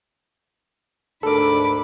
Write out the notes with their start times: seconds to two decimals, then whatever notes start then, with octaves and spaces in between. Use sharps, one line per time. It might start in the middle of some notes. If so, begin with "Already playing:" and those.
1.23 D2 G#2 D4 A4 A#4 B5 D6